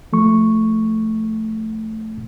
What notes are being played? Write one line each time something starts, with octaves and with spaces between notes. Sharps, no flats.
F3 A3 C#6